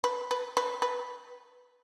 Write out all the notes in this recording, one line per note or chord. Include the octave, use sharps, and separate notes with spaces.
B4
B4
B4
B4